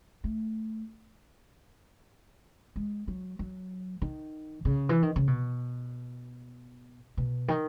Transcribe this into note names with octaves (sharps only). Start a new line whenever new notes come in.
A3
G#3
F#3
F#3
D#3
C#3
E3
D#3
C#3
B2
B2
D#3